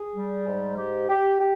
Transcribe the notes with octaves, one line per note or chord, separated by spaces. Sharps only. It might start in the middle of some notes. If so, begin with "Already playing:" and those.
Already playing: G#4
G3
G#2
G4
G4
G4